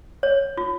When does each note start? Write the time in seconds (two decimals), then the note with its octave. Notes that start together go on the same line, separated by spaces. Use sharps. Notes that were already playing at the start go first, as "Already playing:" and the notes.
0.23 C#5
0.57 F4